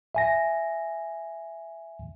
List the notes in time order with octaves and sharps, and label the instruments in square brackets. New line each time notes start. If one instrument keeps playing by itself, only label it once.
[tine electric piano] E5 G#5 A#6